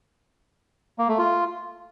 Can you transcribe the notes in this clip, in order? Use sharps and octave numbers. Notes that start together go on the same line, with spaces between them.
A#3
A3
F4